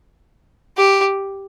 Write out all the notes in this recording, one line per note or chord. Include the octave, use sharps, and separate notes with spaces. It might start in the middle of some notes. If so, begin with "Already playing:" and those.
G4